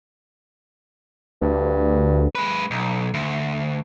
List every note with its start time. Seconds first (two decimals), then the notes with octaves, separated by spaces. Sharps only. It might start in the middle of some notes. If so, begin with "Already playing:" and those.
1.42 D2 G2
2.35 G#3 B4
2.71 B1
3.14 D2